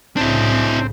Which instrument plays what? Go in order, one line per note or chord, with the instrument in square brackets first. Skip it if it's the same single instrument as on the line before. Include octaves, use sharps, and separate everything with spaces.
[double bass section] C2 A2 C#3 [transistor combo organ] C4 [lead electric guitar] D4 E4